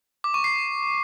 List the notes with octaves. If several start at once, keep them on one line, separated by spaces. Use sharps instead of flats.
D6
C#6
C7